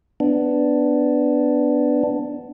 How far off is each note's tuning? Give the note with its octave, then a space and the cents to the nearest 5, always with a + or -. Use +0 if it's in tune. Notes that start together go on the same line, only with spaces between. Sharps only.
B3 +10 D4 +0